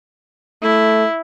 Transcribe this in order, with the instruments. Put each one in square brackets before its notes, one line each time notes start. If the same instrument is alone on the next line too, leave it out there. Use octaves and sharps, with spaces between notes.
[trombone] A3 [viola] E4